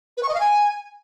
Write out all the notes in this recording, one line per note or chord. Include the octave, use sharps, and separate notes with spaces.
B4
C#6
D#5
F5
G#5